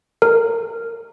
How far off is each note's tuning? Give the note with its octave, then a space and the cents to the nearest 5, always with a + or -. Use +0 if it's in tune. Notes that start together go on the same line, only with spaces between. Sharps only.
A#4 -20